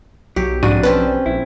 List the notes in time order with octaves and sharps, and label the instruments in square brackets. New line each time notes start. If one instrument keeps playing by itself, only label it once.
[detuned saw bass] B1 [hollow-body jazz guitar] F#3 [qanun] G4
[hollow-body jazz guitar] F2 D4 [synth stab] G#2 F#4 D#7
[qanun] C4 C#4 A5 [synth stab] B4
[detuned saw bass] A#1 [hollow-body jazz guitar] E4